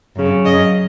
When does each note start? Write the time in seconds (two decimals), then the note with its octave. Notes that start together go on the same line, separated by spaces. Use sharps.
0.15 F#2 C#3
0.44 F#2 C#3 D#5